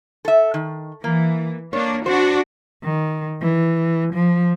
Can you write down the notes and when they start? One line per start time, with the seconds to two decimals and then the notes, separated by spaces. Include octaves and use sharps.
0.25 A4 E5
0.54 D#3
1.04 E3 A#3
1.73 A#3 D4 C#5
2.06 D4 F#4 C5
2.84 D#3
3.41 E3
4.13 F3